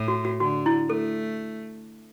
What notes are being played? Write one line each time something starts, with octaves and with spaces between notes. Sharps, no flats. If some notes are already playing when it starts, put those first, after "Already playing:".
Already playing: A2
F#4
F#4
D3 F#4
E4
A3 A4